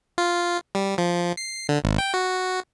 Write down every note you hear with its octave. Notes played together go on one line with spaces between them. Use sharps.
F4
G3
F3
C7
D3
G#1
G5
F#4